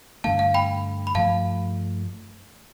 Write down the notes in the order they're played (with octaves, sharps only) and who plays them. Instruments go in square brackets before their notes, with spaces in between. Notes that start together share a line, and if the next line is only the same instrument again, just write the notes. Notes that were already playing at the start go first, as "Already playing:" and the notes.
[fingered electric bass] G2 D3 A3 [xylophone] F5 A5
[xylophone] F5
G5 B5
B5
[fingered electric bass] G2 F3 A3 [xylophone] F5 A5